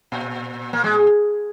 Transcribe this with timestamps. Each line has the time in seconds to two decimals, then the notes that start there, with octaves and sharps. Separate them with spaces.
0.12 A#2
0.73 A#3
0.84 G#3